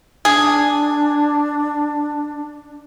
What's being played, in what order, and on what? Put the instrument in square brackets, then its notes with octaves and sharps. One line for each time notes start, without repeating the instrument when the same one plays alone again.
[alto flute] D4 [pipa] G#4